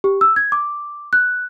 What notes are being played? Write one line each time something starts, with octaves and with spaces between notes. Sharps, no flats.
G4
E6
G#6
D6
F#6